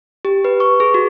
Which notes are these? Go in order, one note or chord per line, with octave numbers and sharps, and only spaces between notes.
G4
B4
C#6
G#4
F#4